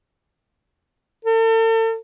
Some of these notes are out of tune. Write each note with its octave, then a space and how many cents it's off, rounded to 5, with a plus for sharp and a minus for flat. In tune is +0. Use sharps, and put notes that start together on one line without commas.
A4 +40